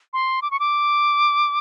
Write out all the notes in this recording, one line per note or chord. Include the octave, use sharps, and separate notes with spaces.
C6
D6
C#6
D6